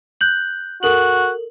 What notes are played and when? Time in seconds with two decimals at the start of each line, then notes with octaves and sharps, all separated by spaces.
0.21 F#6 G6 F#7
0.83 F#4 A4 A#4 F#7